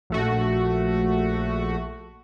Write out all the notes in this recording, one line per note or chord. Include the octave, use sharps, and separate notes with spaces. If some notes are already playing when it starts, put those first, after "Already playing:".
A#1 A3 F#4